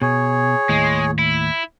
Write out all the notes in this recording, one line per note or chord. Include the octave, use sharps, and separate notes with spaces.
B2 G#4 C#5
D#2 A2 G#3
E4